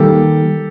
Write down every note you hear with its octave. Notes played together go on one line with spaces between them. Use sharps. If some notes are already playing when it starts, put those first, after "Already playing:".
Already playing: D#3 G3 A#3 G4 A4